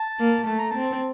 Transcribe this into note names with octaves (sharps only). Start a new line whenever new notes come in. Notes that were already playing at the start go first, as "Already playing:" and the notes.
Already playing: A5
A#3
A3 A5
A#5
C4 A5